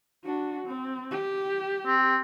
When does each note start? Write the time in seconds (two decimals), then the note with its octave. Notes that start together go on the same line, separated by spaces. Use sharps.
0.24 D4 F#4
0.67 C4
1.11 G4
1.86 C4